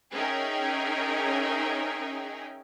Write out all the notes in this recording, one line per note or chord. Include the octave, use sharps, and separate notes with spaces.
C#4 D#4 G#4 A#4 E5 G5